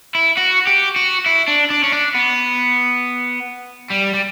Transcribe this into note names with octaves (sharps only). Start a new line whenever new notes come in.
E4
F#4
G4
F#4
E4
D4
D4
C#4
D4
B3
G3
G3